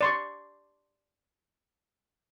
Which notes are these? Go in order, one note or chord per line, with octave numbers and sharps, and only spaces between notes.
D5 C6 C#6